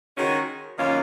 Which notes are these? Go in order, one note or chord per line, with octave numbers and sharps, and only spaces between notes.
D#3 G#3 C#4 F#4
F#2 D#3 A#3 C#4 F4